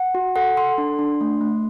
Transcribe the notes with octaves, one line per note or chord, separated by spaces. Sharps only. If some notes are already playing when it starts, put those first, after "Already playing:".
Already playing: F#5
F#4
A4 F#5
A4 C6
D4
D4
A3
A3